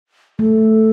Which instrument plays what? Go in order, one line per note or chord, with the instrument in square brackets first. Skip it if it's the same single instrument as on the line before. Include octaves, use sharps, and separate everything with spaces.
[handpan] A3 [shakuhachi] A4